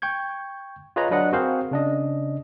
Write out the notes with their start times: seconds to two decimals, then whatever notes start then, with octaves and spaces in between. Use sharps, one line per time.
0.02 G5 C#6 G6 G#6
0.96 F4 G#4 B4 C#5 D#5 A#5
1.11 F#3 D4 B4 D#5 F#5
1.32 C4 F#4 G#4 A#4 C5 F5
1.71 C#3 D4 D#5